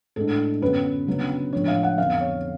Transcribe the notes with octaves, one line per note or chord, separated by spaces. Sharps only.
A2 G#3 D4 A4
F#2 D3 F#3 B3 B4
C#3 F#3 B3 D4
A2 F3 G#3 D4 C#5
F5
F#5
F2 D3 F#3 B3 F5
C#5